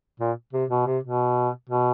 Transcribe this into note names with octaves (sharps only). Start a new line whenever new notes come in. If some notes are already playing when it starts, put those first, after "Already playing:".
A#2
C3
B2
C3
B2
B2